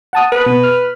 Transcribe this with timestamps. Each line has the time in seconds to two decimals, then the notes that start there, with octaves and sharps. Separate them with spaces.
0.13 F#5 A5 D#6
0.32 B4
0.46 B2
0.63 F6